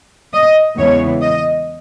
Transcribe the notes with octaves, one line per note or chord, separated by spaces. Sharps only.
D#5
E2 C#3 E3 G#3 B3 C#5
D#5